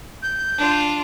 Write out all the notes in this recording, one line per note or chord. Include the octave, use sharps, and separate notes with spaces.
G6
D4 F4